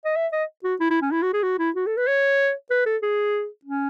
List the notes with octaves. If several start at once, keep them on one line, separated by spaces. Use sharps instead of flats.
D#5
E5
D#5
F#4
E4
E4
C#4
E4
F#4
G#4
F#4
E4
F#4
A4
B4
C#5
B4
A4
G#4
C#4